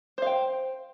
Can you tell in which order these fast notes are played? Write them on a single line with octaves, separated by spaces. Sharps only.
C5 F5 G5